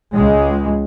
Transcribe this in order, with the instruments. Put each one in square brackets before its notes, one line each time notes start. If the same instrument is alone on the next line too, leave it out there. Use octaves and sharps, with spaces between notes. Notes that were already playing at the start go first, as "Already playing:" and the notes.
[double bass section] C#2 G#3